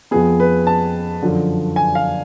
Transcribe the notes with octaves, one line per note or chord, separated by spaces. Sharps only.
F2 F3 B3 G#4
B4
A5
F#2 D3 F3
G#5
F5